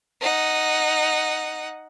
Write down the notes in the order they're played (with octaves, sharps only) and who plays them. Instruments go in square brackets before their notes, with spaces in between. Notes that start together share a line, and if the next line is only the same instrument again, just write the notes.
[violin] D#4 F#5